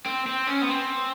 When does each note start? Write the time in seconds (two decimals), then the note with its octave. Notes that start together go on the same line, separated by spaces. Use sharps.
0.06 C4
0.26 C4
0.47 C#4
0.62 B3
0.69 C4